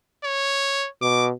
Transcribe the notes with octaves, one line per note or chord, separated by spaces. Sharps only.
C#5
B2 D6